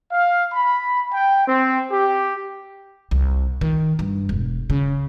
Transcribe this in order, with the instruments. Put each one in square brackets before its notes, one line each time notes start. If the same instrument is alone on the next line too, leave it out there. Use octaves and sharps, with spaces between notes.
[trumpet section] F5
B5
G5
C4
G4
[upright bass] C2
D#3
G2
E1
C#3